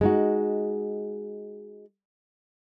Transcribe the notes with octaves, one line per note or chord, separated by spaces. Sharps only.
G#3 D#4 F#4